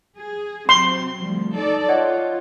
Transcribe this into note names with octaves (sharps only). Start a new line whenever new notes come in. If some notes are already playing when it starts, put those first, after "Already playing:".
G#4
C3 F#3 C4 C6
D2 F3 G3
D#4 A4 D5
F4 C#5 D#5 F#5